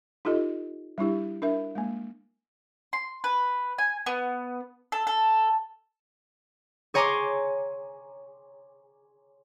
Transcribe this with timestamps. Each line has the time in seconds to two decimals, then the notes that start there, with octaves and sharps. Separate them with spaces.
0.25 D#4 F4 G4 A4 D#5
0.98 G3 D4 E4 G4
1.42 D4 A#4 E5
1.75 G#3 A#3
2.93 C6
3.24 B4
3.78 G#5
4.06 B3
4.92 A4
5.07 A4
6.94 G#4 C#5 G#5 A#5 C6 D6